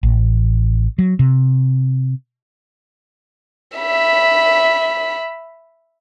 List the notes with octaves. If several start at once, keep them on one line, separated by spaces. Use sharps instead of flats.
A1
F#3
C3
E5 B5